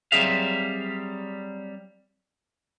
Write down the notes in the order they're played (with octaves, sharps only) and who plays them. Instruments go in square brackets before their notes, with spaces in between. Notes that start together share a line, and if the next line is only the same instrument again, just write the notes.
[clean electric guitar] F#3 G3 C4 G#4 E5 F5